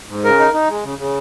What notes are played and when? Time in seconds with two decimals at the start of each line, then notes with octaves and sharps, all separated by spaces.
0.09 G#2
0.24 C#3 A#4
0.39 D#4
0.54 D#4
0.69 G#3
0.84 C#3
0.99 C#3